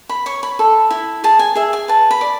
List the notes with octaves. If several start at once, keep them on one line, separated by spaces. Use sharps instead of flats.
B5
C#5 C#6
B5
A4
E4
G#4 A5
G#5
G#4 E5
G#5
B4 A5
B5
D5